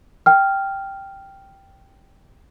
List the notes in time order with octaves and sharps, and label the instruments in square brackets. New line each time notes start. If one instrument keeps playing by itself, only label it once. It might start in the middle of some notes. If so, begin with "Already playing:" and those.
[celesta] G5 F6